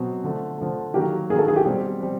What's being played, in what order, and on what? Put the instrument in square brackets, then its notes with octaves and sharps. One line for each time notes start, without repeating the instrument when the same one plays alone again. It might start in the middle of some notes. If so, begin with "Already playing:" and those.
Already playing: [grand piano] B2 F#3 C4
D3 F3 A3
D3 F3 A3
[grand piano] D#3 F#3 A#3 [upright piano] G4
[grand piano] D#3 F#3 A#3 [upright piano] G#4
[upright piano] A4
G#4
G4
[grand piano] B2 G3 C4
G3 C4